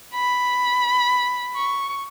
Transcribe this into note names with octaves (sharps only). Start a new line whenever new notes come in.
B5
C#6